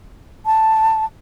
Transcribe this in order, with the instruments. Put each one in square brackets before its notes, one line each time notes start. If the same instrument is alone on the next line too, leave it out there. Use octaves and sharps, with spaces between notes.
[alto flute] A5